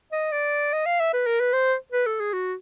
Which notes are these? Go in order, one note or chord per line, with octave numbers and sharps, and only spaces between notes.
D#5
D5
D#5
F5
E5
B4
A#4
B4
C5
B4
A4
G#4
F#4